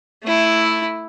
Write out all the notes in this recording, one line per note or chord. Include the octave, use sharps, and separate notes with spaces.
A3 E4